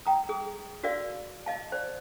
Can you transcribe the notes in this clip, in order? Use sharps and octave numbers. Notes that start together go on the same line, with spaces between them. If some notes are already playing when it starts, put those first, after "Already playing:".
G5 A#5 D#6
G#4 D#6
F#4 A#4 D5 F5
D#5 F5 A5
C5 D5